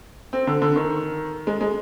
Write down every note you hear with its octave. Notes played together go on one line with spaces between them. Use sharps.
C4
D3
D3
D#3
G#3
G#3